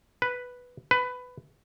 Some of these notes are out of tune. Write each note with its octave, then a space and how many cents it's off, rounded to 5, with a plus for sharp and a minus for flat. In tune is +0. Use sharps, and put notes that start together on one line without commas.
B4 +0
B4 +15